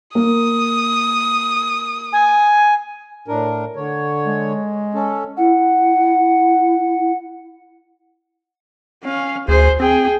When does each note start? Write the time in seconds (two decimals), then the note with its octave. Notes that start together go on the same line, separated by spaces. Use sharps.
0.15 A#3 D#6
2.13 G#5
3.28 A2 D4 A#4
3.76 D3 C#5
4.26 G#3
4.94 C#4 A4
5.37 E4 F#5
9.03 C#4 F5
9.48 D2 G#4 C5
9.80 C4 G#4 G5